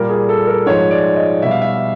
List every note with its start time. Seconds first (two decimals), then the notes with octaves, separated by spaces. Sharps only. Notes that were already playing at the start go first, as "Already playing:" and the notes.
Already playing: A#2 G3 A#4
0.09 G#4
0.29 A4
0.47 A#4
0.66 G#2 F3 G#3 C#5
0.91 D5
1.16 D#5
1.42 B2 G3 E5
1.51 F5
1.62 E5